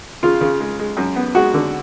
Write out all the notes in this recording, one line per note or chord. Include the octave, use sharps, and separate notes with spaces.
C#3 F4
C#3
G#3
G#3
F#2
B3
G#3 F#4
D3